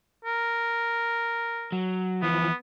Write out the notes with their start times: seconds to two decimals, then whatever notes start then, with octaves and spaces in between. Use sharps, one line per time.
0.25 A#4
1.72 F#3
2.22 E3 F3 B3